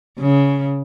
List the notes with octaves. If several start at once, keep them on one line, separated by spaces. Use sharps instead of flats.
C#3